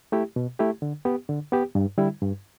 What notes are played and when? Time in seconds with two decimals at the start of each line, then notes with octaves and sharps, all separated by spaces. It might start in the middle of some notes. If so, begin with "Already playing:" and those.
0.12 A3 E4 G4
0.36 B2
0.59 A3 E4 G4
0.82 D3
1.05 B3 G4
1.29 D3
1.52 B3 G4
1.75 G2
1.98 D3 G3 E4
2.22 G2